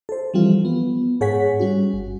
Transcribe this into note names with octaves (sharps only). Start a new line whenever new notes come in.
A4 C5
E3 F3 G3 C4 F4
B3
G#2 G#4 C#5 F#5 G#5 B6
G3 C#4 F#4
G1